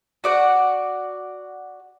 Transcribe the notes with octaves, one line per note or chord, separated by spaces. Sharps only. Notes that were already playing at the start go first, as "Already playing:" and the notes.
F#4 D5 F#5